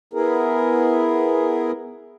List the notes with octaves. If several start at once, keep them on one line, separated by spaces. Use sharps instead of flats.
B3 E4 G#4 A#4